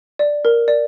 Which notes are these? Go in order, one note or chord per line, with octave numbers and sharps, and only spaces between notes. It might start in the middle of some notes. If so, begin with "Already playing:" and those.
D5
A#4
D5